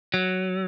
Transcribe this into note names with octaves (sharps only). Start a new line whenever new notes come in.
F#3